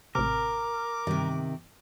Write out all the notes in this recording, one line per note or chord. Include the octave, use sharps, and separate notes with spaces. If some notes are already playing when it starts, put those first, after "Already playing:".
A1 C3 A#4 D6
G2 C3 D#3